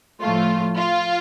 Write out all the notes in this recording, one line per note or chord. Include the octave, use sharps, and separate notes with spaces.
A2 F3 A3 F4
F4